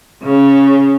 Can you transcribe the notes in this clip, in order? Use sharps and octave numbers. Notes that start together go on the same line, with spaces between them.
C#3